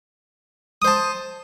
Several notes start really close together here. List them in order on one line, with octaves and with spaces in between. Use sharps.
D#6 C5 A5